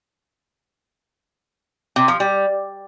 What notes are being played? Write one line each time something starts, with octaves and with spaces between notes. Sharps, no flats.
C3
F3
G3